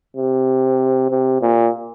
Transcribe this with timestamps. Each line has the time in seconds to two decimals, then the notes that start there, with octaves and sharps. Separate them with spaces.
0.17 C3
1.11 C3
1.42 A#2